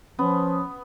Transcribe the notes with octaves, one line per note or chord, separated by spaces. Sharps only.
F3 B3 C#4